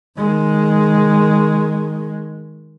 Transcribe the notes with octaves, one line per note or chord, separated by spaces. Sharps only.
D#3 G#3